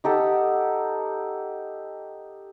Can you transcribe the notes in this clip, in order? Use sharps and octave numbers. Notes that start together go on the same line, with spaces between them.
D#4 G4 A4 F#5